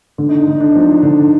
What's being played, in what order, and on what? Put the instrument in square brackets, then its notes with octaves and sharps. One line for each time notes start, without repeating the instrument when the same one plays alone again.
[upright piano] D3 [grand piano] D4
[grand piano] D#4
D4
[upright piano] D3 [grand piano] D#4
[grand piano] D4
[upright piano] F3 [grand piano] D#4
[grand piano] D4
D#4
[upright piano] D3 [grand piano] D4